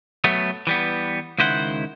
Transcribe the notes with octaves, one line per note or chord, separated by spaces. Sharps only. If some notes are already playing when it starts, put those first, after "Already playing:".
F#3 A3 B3
E3 G3 B3
C#2 D#3 E4 C5 F#5